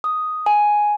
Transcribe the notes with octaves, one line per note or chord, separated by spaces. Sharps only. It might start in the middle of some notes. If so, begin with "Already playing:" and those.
D#6
G#5